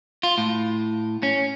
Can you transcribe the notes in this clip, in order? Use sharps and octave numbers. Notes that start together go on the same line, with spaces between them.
F4
A2
C#4